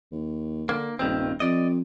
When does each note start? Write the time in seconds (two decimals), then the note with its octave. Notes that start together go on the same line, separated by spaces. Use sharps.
0.12 D#2
0.69 D3 A#3
0.99 D#1 G2 D#3 C4
1.40 F2 D5 D#5